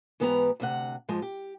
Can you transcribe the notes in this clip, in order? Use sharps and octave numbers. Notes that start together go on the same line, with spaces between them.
G#2 E3 B3 G4 G#5 A#5
D2 C3 F#5
G#2 F3 G#3
G4